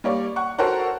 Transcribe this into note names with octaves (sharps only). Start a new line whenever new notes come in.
G3 A#3 C#5 D5
F#5 C#6
F#4 A4 A#4 C5 C#5 F#5